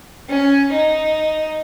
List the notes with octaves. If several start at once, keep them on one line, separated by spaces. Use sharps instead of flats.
C#4
D#4